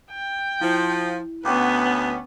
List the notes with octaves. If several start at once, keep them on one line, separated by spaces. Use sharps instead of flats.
G5
F3 E4
D2 B3 C#4 B4 F#5 G5 D6